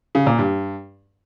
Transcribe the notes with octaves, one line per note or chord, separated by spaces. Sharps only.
C#3
A#2
G2